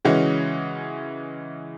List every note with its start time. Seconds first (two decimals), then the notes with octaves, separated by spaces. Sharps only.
0.05 C#3 E3 G#3 C#4 F#4